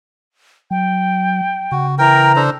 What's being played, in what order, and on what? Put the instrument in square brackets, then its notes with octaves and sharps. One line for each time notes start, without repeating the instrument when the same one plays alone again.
[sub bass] F#3 [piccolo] G5
[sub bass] C#3 [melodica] F#4
[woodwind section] E3 A#5 [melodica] A#4 G5
[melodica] D4 A4 C5